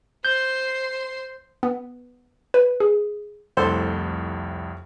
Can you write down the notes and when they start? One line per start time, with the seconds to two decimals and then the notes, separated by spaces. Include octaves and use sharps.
0.25 C5 C6 G6
1.63 B3
2.54 B4
2.80 G#4
3.57 C2 F2 A2 A4 C5 C6